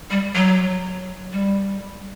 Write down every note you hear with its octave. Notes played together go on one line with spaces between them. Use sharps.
G3
F#3
G3